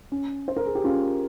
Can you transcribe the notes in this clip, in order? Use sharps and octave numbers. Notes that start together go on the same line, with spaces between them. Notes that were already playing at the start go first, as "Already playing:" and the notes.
C#4
C5
A#4
G#4
G4
C#4 F4